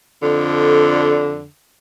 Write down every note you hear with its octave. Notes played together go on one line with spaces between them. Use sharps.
F2 D3